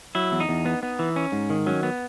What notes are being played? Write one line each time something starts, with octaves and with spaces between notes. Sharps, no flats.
F#3 E4
E2
D#4
E2
B3
B3
E3
C#4
G#2
D#3
F#3 C#4
B3